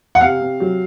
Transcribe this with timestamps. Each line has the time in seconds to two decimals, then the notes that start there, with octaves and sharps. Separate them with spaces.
0.15 F#5
0.20 C3 F5
0.40 C3
0.60 F#3